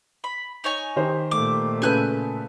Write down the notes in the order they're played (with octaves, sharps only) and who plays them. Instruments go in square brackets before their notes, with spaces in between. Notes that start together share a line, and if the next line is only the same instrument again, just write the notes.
[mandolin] B5
D#4 C#5 G#5
[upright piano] D#3 G4 C5
[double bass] A#2 A3 [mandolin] D6
[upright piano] C#3 A4 B4 [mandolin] G#5 F#6 G6